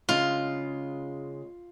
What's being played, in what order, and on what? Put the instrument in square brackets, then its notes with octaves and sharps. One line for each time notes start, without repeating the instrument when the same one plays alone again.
[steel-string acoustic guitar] C#3 G#3 [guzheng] F4